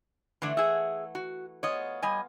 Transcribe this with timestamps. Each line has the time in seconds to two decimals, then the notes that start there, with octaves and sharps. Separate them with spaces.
0.42 D3 E3 A3 D4
0.57 G#4 E5 F#5
1.15 F#4
1.63 B3 F4 G#4 C#5 D#5
2.02 G3 D#5 G#5